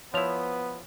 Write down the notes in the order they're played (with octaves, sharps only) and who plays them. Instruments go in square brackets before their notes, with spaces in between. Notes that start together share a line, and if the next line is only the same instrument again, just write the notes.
[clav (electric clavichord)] F3 E4 [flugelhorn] B3 [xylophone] C#5 F7